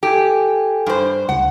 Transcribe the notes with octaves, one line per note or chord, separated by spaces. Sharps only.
G4 A4 G5 G#5
G2 C5
C#2 F#5